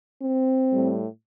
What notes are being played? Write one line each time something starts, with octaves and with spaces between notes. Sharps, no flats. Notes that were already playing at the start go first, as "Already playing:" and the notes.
C4
A2 G3